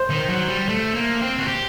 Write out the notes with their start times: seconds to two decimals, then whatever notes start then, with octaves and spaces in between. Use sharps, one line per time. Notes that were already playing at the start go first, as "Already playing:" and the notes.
Already playing: C5
0.10 D#3
0.30 F#3
0.49 G3
0.69 A3
0.95 A#3
1.21 C4
1.39 F#4
1.48 G4